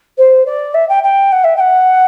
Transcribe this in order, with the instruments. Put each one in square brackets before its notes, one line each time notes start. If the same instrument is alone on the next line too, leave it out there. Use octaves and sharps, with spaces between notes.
[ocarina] C5
D5
E5
G5
G5
F#5
E5
G5
F#5